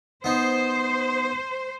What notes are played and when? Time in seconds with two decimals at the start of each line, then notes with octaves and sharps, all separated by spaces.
0.24 B3 D#4 C5